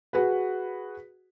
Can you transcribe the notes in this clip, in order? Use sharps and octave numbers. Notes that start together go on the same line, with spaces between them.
F#4 G#4 B4